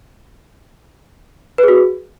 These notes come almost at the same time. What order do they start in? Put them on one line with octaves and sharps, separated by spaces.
B4 G#4 F#4